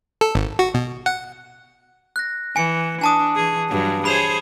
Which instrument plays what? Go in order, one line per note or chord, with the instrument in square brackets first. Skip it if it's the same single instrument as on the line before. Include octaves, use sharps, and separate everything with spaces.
[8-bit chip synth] A4
G#1
F#4
B2
F#5
[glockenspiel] F#6 A#6
[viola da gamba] E3 [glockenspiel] G#5 C#7
[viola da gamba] D4 [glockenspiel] G#5 A5 D#6
[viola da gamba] E3 G#4
G2 F#3
[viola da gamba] G#4 C5 C#5 [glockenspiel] B5 F7